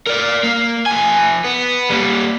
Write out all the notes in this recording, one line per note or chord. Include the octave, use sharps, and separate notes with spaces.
A#4 D5
A#3
F3 G#5
B3
G3 A#3